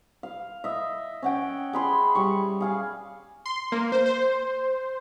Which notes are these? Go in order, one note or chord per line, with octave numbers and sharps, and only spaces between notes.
F5
D#5 E5
C#4 F#5 G5
G#4 B5 C6
G3 C#6
G#4 F5 G#5
C6
A#3
C5
C5